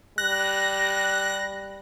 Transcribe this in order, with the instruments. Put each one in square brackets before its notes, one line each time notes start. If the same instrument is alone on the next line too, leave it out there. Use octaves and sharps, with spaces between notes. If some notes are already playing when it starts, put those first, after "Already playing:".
[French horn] G3 [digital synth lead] F#6 [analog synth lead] A#6